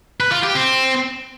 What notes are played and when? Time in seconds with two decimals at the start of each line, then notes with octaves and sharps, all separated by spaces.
0.20 B4
0.32 F4
0.43 G4
0.55 C4